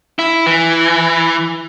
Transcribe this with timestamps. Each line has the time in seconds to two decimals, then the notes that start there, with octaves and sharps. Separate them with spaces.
0.19 E4
0.47 E3